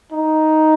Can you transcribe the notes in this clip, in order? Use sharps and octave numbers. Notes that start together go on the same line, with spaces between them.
D#4